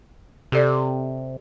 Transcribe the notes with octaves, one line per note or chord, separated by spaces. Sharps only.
C3 G4 A4 D5